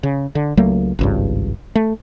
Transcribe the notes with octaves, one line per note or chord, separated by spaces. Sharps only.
C#3
D3
C#2 F#3 A3 A#3
G#1 C#2 G2
A3